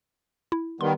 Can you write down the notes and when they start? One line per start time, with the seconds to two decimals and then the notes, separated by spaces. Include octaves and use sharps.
0.52 E4
0.81 D#3 G3 B3 C6